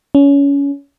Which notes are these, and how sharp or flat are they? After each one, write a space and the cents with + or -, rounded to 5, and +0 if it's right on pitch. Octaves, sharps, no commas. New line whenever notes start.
C#4 +25